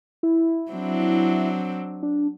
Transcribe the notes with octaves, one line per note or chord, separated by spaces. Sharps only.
E4
F#3 C4 D4
D4